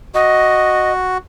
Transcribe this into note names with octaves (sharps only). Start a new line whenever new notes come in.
F#4 D#5